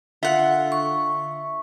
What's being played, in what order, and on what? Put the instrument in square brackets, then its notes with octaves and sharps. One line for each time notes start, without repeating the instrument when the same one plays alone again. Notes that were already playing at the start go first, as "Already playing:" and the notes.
[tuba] D3 [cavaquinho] F4 F#5 [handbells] E5
[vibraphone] C#6